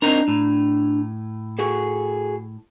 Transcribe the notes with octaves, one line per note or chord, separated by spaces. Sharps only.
C4 D4 D#4 A#4 A#5
A2
F#4 G#4 A4